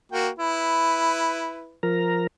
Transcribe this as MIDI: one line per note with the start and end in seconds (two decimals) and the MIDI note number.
0.12 0.28 58
0.12 0.28 66
0.12 0.28 79
0.39 1.76 64
0.39 1.76 71
1.83 2.27 53
1.83 2.27 70
1.83 2.27 82